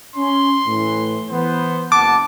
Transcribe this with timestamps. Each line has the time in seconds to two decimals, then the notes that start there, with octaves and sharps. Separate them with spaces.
0.16 C#4 C6
0.66 A2 E3
1.29 E3 B3 C5
1.92 F#1 F#5 A5 D6